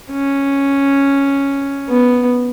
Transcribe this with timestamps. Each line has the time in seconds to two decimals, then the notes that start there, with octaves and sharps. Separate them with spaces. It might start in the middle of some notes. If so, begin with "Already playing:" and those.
0.12 C#4
1.89 B3